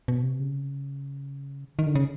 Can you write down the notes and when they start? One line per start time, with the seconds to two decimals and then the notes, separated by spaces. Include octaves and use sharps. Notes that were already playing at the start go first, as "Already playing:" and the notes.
0.08 B2
0.23 C3
0.40 C#3
1.79 D#3
1.86 D3
1.95 C#3